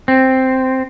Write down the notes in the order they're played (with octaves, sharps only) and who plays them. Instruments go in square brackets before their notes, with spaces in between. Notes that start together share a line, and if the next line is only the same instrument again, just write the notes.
[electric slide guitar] C4